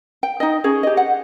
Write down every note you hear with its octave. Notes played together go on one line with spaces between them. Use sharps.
G5
D#4 D#5
C#4 G#4 C#5
G4 D#5
F#5